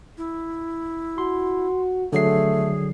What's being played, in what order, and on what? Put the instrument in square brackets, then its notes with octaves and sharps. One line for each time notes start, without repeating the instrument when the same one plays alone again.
[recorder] E4
[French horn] F#4 [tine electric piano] C6
[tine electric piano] D3 F#3 C7 [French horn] A3 [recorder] G#4